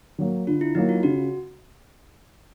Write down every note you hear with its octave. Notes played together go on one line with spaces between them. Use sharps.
F#3 A#3
D3 F4
E4
F#3 A#3 D#4
F4
C#3 F#4